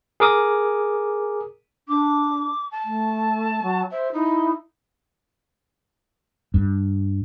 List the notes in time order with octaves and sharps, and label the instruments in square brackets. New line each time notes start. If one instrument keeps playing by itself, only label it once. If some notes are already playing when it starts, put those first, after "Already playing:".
[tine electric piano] G#4 A#4 D6 D#6
[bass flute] D4 [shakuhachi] D6
[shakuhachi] A5
[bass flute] A3
F#3
[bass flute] C5 [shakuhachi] E5
[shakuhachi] D#4 [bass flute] E4
[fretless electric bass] G2